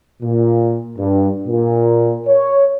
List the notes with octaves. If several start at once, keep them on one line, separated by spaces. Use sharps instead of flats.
A#2
G2
A#2
C#5